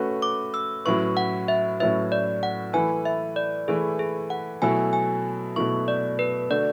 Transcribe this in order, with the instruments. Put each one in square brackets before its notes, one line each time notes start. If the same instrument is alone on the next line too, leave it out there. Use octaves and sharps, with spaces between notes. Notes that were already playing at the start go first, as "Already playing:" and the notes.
Already playing: [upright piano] A3 C#4 F#4 B4
[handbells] D6
E6
[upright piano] A2 F#3 C#4 E4 B4 [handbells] C#6
[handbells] F#5
E5
[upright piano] A2 F#3 C#4 E4 B4 [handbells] E5
[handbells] D5
F#5
[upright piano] E3 A3 E4 B4 [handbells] G#5
[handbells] E5
D5
[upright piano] E3 A3 E4 B4 [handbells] G#4
[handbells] G#4
F#5
[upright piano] B2 F#3 A3 E4 [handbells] G#5
[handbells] G#5
[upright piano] B2 F#3 A3 E4 [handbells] C#6
[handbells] D5
B4
[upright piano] D3 A3 D4 F#4 [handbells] D5